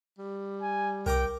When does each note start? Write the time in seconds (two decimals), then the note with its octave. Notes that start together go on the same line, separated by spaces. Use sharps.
0.18 G3
0.62 G#5
1.06 C2 A#4 G5 A#5 D6